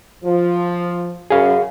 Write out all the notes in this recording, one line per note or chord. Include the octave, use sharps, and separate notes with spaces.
F3
F#2 G#4 F5